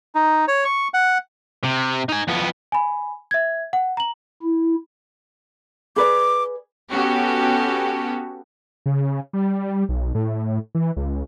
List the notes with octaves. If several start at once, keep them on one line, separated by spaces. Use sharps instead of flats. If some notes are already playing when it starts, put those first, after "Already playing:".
D#4
C#5
C#6
F#5
C3
D#4 G#5
F2 B3
G#5 B5
E5 G#6
F#5
A#5 F#7
E4
G#4 B4 D5 D6
B3 C#4 F#4 G4 A4
C#3
G3
B1
A2
E3
C#2